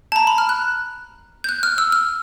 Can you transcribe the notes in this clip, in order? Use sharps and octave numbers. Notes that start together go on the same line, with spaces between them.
A5
A#5
B5
F6
F#6
G6
F#6
F6
E6
F6